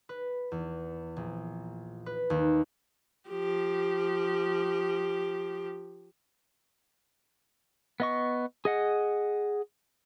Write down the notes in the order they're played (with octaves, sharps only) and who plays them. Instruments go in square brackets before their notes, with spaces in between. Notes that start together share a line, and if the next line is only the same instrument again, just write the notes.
[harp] B4
E2
A#1
B4
D#2
[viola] F3 G4
[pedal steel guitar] B3 D#5 C#6
G#4 D#5 F#5